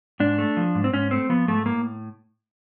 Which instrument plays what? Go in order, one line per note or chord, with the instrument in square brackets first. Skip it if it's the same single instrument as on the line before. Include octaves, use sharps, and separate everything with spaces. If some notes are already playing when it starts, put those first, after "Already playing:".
[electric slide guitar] G#2 D4
A3
F3
G#2
C4
G#2 C#4
A3 C4
F3 B3
G#2 A3
A2 A#3